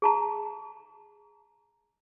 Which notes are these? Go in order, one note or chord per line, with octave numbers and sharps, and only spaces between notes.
G#4 A5 A#5